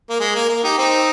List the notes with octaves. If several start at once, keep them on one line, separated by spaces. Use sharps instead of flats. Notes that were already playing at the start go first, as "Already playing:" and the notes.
A#3
G#3
A#3
A#3
D#4 G4
C4 D#4